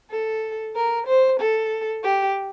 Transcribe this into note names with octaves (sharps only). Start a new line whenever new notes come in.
A4
A#4
C5
A4
G4